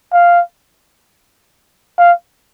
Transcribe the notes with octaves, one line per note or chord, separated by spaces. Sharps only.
F5
F5